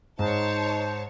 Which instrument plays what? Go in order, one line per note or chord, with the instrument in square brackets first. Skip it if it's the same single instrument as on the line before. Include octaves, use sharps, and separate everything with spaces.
[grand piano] G#2 [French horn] D#4 [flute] C5 [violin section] C#5 A5